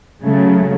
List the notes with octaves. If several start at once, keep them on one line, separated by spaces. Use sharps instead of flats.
C#3 F#3 A3